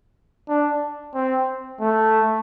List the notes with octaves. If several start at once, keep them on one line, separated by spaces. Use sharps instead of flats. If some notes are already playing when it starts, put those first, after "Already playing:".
D4
C4
A3